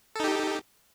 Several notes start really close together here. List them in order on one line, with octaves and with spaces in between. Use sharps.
A4 D#4 G4